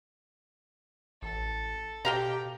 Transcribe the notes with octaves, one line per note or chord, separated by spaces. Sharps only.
A1 A4
B2 G4 D#5 F5 A#5